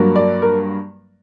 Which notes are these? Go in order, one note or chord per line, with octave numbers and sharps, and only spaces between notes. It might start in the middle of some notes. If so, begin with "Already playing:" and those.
Already playing: G2 F#3 A#3
D5
A#4